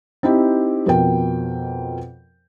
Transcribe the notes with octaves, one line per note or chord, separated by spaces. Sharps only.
C4 D#4 E4 G4
F2 B2 A#4 G5